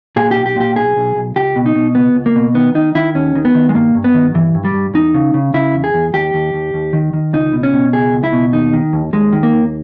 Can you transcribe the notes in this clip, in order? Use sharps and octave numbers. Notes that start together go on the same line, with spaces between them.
A#2 G#4
B1 G4
G4
A#2 G4
B1 G#4
B1
B1
C#2 G4
B2
D#4
B2
C#2 B3
C#2
A#3
B2
D#3 B3
D#3 D#4
D#3 E4
D#2 C#4
D#3
B3
D#3
G#3
G2 A#3
G2
B3
D#3
G2 E3
G2
G3
G2
E2 D#4
C#3
C#3
C#3 E4
E2
G#4
E2
D#2 G4
D#2
D#2
D#2
D#3
D#3
C#2 D#4
B2
C#4
B2
C#2 G#4
C#2
E4
B2
D#2 D#4
D#3
D#2
D#2 G#3
D#3
A#3
D#2